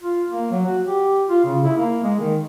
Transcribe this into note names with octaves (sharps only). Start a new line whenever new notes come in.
F4
A#3
F#3
F#4
G4
F4
C#3
E4
A#3
G#3
D#3